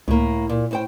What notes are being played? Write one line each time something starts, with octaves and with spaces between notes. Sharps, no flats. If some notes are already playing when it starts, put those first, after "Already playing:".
C#2 A2 A#3
A#2
A2 C5 G5